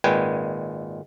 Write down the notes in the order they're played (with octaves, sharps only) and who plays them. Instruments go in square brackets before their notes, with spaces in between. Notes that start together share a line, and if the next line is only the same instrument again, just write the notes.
[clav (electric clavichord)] G#1 A#2 G#3 B4 G5 G#5